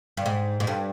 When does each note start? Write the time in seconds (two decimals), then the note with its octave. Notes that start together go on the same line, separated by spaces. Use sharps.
0.17 G2
0.26 G#2
0.60 G#2
0.67 G2